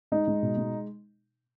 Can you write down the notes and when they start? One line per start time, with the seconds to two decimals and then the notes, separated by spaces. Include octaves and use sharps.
0.12 G#3 D#4
0.28 G#3
0.43 B2
0.58 G#3